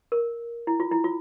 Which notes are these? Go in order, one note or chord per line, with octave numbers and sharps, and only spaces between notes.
A#4
E4
F4
E4
F4